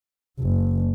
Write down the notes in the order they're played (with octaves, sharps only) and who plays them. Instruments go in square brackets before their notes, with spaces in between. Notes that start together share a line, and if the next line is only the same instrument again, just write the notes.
[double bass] F#1